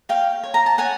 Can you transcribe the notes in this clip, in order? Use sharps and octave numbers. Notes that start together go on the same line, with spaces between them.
C#5 F5 G5
C#5
A#5
A5
C#5 F#5 G#5